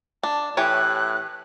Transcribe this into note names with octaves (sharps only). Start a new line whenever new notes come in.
D4 A5
A2 E3 G4 C#5 F#6